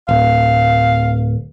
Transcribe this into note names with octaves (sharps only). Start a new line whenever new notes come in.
D1 F5